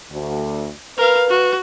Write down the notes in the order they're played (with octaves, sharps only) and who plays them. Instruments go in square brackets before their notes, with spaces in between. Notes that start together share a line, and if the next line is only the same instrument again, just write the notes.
[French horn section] D2
[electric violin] A#4 F5 [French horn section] B4
[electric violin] F#4